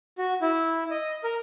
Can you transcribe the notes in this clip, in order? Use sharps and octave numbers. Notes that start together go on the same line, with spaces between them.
F#4
E4
D#5
A#4